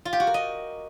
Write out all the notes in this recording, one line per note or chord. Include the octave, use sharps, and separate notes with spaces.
F4
G4
F#4
A#4
D#5